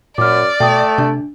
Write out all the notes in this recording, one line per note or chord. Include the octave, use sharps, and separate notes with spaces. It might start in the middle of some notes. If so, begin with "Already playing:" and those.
F#2 A#2 D5 D6 F6
B2 A3 G5 D#6
C3 D4